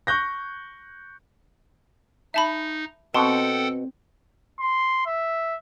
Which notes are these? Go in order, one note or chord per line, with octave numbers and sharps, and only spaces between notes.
C#6 F#6 G6 A#6
D#4 E5 A5 B5
B2 C4 A4 F#5 G5 A5 C6
C6
E5